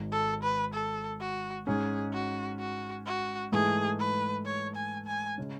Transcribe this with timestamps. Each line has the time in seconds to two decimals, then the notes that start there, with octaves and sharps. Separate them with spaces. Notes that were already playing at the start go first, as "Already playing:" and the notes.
Already playing: G#1 G#2 G#3
0.12 A4
0.43 B4
0.74 A4
1.21 F#4
1.67 G#2 G#3 C#4 G#4
2.13 F#4
2.59 F#4
3.06 F#4
3.52 G#2 E3 A3 G#4
3.99 B4
4.45 C#5
4.76 G#5
5.07 G#5
5.38 C#3 G#3 C#4